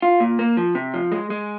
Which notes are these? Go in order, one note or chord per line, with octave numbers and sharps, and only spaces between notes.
F4
A#2
A#3
F3
C3
F3
G#3
G#3